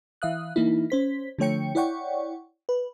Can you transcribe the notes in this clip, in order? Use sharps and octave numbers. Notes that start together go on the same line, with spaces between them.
E3 E5 F5 D#6 F#6
E3 A#3 D#4 E4
C#4 C5 B6
D3 F3 A3 C#5 G5 C#7
E4 C#5 D5 F#5 G5 C#6
B4